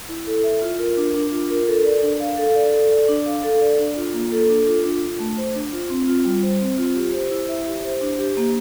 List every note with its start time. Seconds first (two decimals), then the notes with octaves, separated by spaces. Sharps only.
0.09 E4
0.27 A4
0.44 E5
0.62 F4
0.79 A#4
0.97 D4
1.15 D4
1.32 F4
1.50 A#4
1.67 A4
1.85 D5
2.02 D4
2.20 F5
2.37 A4
2.55 D5
2.72 A4
2.91 D5
3.08 D4
3.26 F5
3.43 A4
3.61 D5
3.78 D4
3.96 F4
4.14 A#3
4.32 A4
4.49 D4
4.67 F4
4.85 D4
5.03 F4
5.19 A3
5.37 C5
5.55 D4
5.72 F4
5.90 C4
6.08 F4
6.25 G3
6.43 C5
6.60 C4
6.78 F4
6.96 G4
7.13 C5
7.31 E4
7.49 E5
7.66 G4
7.84 C5
8.01 D4
8.19 G4
8.37 A#3